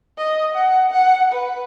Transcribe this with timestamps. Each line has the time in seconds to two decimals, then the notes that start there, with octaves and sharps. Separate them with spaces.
0.18 D#5
0.54 F#5
0.91 F#5
1.32 B4